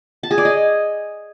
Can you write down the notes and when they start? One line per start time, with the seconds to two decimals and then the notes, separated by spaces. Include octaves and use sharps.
0.23 A5
0.31 G#4
0.38 D5
0.45 D#5